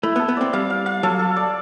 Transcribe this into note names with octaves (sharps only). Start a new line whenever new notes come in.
A3 E4
B3
A4
B3
C4 D5
G3 F5
F5
F5
F#3 A4
A4
D5